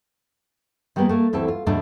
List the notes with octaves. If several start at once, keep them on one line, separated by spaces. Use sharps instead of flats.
D#3 G3 G#3 A#3 B3
A3 A#3
D2 E3 C4 A4
F4
E2 G#2 B2 D3 A3 D4